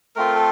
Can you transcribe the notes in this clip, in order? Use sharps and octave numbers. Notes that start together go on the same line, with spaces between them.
A3 C4 F4 A#4
A4